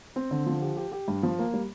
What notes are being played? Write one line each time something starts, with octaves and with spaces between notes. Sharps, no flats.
C4
D3
F3
G4
G4
G4
G2
F3
A#3
G3